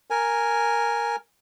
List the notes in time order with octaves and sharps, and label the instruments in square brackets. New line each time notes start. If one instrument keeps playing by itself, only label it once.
[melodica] A#4 G#5